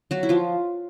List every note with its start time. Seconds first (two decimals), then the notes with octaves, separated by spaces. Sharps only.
0.11 F#3 F#4
0.23 E4
0.29 F3 F4